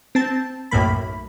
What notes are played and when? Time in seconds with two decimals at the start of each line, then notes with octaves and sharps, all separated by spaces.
0.15 C4 A5
0.71 B1 F#2 A2 A#3 B5